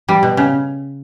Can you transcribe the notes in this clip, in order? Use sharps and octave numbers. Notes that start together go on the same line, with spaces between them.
G3
B2
C#3